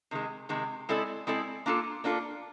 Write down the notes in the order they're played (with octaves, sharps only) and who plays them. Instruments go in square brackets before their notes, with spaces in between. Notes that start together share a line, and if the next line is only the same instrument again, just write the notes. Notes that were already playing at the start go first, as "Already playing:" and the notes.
[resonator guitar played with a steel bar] C3 D#3 G#3
C3 D#3 G#3
G#3 C4 E4 A4 D5
G#3 C4 E4 A4 D5
A#3 D4 F4 A4
A#3 D4 F4 A4